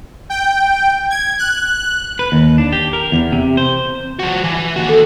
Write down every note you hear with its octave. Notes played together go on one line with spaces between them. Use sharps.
G5
G#6
F#6
B4
D#2
D4
G4
A#4
E2
C3
C5
F3 F#4
E3
D#2 F#4
A4